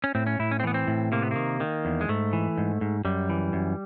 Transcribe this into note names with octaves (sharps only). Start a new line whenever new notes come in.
C#4
A2 C4
C#4
A2 E4
C#4
C4
E3 B3
C4
A2
C3 A#3
B3
D#3 A#3
D#3
E2
G#3
G#2 A3
E3
G#2
G#2
F#2 G3
E3
F#2